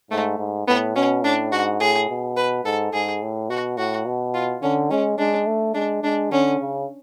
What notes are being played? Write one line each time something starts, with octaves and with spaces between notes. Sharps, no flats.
G#2 A3
G#2
A2 B3
B2 C#4
A2 D4
G#2 F#4
A2 G#4
B2
B4
G#2 A4
G#2 G#4
A2
B2 F#4
A2 F#4
B2
F4
D3 C#4
G#3 C#4
G#3 D4
A3
G#3 D4
G#3 D4
D3 C#4
C#3